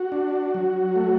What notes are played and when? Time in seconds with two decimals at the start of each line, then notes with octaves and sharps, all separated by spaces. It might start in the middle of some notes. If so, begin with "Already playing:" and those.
Already playing: F#4
0.12 D4
0.54 F#3
0.96 A3